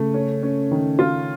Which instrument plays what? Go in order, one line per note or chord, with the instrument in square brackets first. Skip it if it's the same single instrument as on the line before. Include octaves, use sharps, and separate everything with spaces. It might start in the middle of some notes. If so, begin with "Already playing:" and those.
Already playing: [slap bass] C#3 [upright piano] A3
[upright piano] C#4
C#4
D#3
F4